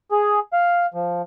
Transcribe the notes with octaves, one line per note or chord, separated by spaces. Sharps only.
G#4
F5
F3